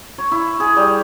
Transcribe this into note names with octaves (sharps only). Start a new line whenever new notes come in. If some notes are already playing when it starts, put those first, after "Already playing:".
C#5
E4
G#4
G3